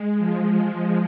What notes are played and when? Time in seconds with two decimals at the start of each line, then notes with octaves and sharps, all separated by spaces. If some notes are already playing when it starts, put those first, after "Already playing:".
Already playing: G#3
0.18 F3